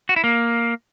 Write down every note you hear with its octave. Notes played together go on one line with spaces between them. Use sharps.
F#4
E4
A#3